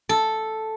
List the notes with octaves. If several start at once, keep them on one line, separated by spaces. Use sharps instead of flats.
A4